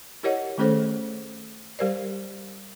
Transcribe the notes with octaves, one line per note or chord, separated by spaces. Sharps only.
E4 G4 A#4 C#5 D#5 F#5
D#3 A3 C#4 G#4 A4 C5
G3 G4 A#4 C5 D5